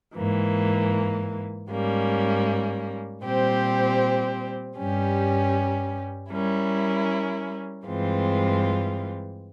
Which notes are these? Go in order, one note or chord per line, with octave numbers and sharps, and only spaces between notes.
G#2 E3 A#3
G#2 G3 A#3 C#4
A#2 G3 C4 G4 C5
G2 G3 C#4 G4
G3 C#4 E4 A#4
G2 E3 G#3 C4 F4